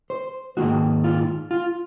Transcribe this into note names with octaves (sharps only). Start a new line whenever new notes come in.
C5
G#2 D#3 A#3 D#4 F#4
F4
F4